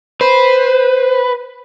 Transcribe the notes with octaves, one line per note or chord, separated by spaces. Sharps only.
B4 C5